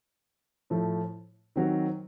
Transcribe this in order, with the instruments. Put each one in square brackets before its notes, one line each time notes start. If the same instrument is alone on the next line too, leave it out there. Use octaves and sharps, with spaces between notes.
[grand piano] A2 F3 A3
D#3 F#3 C4 F#4